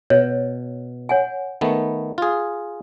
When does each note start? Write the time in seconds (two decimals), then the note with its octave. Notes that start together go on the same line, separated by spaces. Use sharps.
0.10 B2 C#5
1.09 C#5 F#5 G#5
1.61 D#3 A3 B3
2.18 F4 G#4